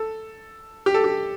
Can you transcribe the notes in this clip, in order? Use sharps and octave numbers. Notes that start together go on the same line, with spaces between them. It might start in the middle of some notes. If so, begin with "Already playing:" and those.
Already playing: A4
G4
A4
G4